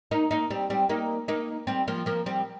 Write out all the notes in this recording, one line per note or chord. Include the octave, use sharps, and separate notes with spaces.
A#3 D#4
A#3 D#4
G3 C4
G3 C4
A#3 D#4
A#3 D#4
G3 C4
F3 A#3
F3 A#3
G3 C4